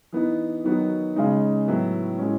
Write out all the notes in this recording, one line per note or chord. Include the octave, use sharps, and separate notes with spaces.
E3 B3 D#4
D#3 F#3 B3 D#4 F#4
C#3 G#3 D#4
A2 F#3 B3 E4
A2 G#3 C#4